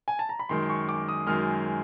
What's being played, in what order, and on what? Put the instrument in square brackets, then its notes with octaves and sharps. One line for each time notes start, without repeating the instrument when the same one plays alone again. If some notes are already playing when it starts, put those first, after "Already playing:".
[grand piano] G#5
A5
A#5
B5
F#2 D#3 G#3 C6
C#6
D6
D#6
F#2 D#3 G#3 F6